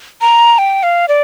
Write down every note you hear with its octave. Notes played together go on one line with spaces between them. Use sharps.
A#5
G5
F5
D5